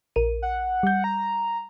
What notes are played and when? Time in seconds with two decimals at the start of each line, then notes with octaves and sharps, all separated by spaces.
0.16 A#1 A#4 D#7
0.42 F#5
0.83 G3 G6
1.04 A#5